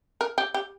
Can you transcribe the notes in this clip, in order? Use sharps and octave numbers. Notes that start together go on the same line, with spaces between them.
A#4
G4
G4